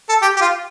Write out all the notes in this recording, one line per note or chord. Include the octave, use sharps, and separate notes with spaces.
A4
G4
G4
F4